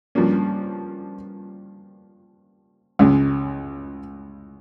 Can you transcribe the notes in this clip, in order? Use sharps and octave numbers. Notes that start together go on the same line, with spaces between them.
G2 F3 A#3 C#4
C#2 C#3 G#3 C#4